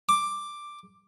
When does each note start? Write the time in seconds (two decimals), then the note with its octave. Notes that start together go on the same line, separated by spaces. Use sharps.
0.09 D6